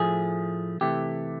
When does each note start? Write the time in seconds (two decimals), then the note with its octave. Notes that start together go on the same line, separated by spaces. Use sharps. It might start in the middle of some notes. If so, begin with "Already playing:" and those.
Already playing: A2 F3 A3 G#4
0.81 C3 E3 A3 G4